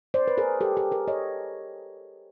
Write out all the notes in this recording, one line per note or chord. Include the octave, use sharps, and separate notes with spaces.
C5 D5
B4
G#4 A#4
G4 A4
G4 A4
G#4 A#4
C#5 D#5